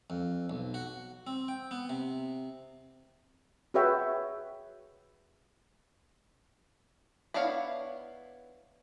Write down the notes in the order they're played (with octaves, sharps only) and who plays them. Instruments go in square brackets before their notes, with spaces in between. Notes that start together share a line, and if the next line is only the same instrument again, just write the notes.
[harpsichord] F2
B1
F#4
C4
G5
B3
C3
[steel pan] F#4 G#4 B4 C#5 E5 G5
[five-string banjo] B3 D4 E4 C#5 F5